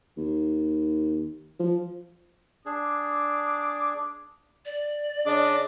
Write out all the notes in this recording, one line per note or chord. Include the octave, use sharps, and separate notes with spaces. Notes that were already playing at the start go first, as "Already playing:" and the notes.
D#2
F3
D4 G#4 D6
D5
C#3 D4 D#5 D6